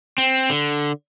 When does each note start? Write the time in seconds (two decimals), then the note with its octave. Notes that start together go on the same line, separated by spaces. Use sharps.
0.18 C4
0.50 D3